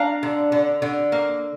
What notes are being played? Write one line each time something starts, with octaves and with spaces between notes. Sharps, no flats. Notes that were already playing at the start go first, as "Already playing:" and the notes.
Already playing: D4 F5 A#5
D3
D3
D3
A#3